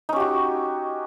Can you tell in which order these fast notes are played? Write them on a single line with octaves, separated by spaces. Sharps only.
D#4 C#4 G4 F#4